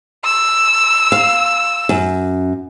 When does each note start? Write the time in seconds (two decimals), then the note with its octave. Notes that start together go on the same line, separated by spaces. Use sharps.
0.25 E6
1.12 F5
1.89 F#2